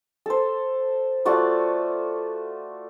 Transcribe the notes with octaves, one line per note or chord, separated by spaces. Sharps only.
A4 C5
A3 F4 F#4 D5